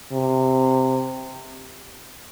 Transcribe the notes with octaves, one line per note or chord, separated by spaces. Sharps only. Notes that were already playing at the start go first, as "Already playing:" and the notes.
C3